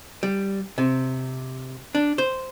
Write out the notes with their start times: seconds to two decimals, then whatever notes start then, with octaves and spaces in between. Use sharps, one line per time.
0.23 G3
0.78 C3
1.95 D4
2.18 C5